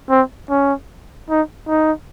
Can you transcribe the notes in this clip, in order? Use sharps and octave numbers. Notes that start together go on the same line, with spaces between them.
C4
C#4
D#4
D#4